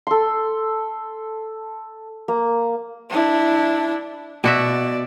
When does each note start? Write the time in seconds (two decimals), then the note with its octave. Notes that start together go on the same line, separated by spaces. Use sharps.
0.07 A4 C6
2.28 A#3
3.10 D4 E4
4.44 B2 F#4 D5 E5